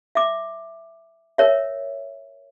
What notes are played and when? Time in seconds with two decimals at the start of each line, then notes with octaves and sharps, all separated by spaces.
0.15 E5 D6
1.38 A#4 C#5 E5